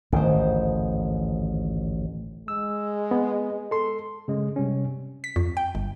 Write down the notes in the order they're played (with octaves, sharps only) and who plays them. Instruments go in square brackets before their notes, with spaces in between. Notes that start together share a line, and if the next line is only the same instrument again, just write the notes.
[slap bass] A1 D2 G#2 [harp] D#3 C5
[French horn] G#3 [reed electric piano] E6
[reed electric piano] B3
A4 C6
[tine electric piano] C#3 G#3
C3 G3 C#4
[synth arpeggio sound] B6
F2
G5
G1